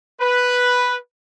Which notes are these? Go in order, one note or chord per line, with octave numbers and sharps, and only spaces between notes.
B4